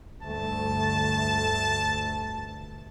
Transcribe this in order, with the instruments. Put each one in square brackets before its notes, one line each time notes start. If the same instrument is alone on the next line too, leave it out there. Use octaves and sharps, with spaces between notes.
[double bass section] D2 G2 A3 [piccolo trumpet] A5